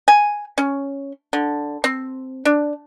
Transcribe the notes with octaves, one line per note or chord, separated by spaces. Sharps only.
G#5
C#4
D3
C4
D4